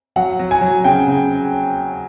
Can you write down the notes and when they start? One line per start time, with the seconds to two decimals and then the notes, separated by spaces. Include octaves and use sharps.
0.16 F#3 F#5
0.39 F#3
0.51 G#5
0.61 F#3
0.84 C#3 G5
1.07 C#3